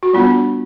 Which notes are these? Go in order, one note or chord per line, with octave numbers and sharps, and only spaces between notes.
F#4
G3 B3 D4 F4